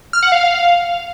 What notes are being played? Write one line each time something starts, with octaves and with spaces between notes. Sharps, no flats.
F6
F#5
F5